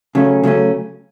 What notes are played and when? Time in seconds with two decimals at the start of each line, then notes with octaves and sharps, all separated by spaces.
0.15 C#3 F#3 A3 C#4
0.43 C#3 F#3 A3 C#4